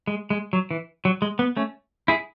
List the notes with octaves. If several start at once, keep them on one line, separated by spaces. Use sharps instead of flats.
G#3
G#3
F#3
E3
F#3
G#3
B3
A3 C#4
E4 G#4